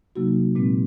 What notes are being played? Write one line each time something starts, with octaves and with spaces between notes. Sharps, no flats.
C3 F#3 A#3 D#4 F#4
A#2 G#3 C4